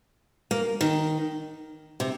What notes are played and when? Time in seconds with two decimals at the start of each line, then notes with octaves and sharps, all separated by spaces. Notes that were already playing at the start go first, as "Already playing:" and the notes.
0.51 A#3
0.81 D#3
2.00 C3